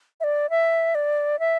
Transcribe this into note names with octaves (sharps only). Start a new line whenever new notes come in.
E5
D5
E5
D5
E5